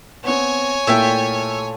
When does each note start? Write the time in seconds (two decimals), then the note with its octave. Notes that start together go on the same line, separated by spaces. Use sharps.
0.24 B3 C4 C#5 G#5
0.87 A#2 A3 E4 A4 E5 G5